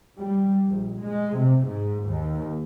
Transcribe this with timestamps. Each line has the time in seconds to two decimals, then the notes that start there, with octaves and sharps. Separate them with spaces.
0.19 G3
0.68 A#1
1.04 G#3
1.38 C3
1.67 G#2
2.06 D#2